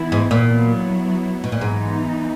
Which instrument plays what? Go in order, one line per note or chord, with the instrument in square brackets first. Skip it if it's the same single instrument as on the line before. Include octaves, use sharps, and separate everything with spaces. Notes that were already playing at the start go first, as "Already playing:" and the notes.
Already playing: [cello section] E3 B3 E4
[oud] G#2
A#2
[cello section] F#3 B3 E4
[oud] B2
A#2
[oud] G#2 [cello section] E3 B3 D#4